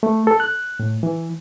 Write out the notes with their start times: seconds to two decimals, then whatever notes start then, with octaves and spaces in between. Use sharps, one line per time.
0.03 A3
0.27 A4
0.40 F#6
0.80 A2
1.03 E3